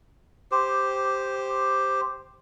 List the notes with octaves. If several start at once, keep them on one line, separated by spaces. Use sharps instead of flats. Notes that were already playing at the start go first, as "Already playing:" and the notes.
G4 C5